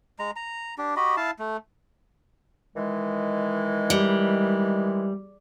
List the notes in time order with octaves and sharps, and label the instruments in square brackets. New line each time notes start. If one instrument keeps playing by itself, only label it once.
[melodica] G#3 A#5
A#5
D4 G4
F#4 G4 D#5 B5
E4 F5 A5
A3
[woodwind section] D#3 E3 G#3
[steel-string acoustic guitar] G3